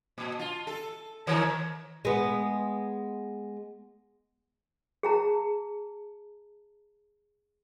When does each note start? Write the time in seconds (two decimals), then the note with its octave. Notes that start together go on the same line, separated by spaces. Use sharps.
0.18 A#2
0.39 F4
0.67 A4
1.27 D#3 A#4 C#5
2.05 G#3 B3
5.03 G#4 A5 A#5